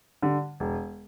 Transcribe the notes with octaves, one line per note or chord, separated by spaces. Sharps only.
D3 G3
E1